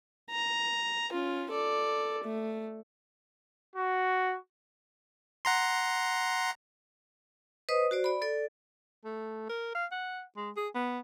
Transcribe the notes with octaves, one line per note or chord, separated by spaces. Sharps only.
A#5
C#4 F4
A4 D5
A3
F#4
F#5 A#5 C6
B4 C5 D#5 D#6
F#4 C5 D5
D5 B5
A4 D5
A3
A#4
F5
F#5
G#3
G#4
B3